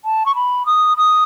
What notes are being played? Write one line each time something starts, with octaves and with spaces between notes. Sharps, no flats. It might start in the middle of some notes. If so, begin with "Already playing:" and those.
A5
C#6
B5
D#6
D#6